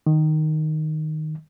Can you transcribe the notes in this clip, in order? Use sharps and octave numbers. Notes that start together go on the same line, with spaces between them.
D#3